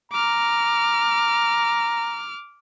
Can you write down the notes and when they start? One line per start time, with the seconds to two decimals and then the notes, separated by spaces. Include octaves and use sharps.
0.12 A#5 D6 F6